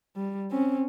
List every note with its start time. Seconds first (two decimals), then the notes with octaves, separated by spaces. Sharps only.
0.16 G3
0.51 C4 C#4